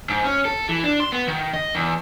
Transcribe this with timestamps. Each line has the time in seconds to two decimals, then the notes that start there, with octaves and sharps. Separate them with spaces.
0.09 G#2
0.24 C#4
0.45 A4
0.69 E3
0.84 D4
1.00 C6
1.12 B3
1.28 D#3
1.53 D#5
1.75 E2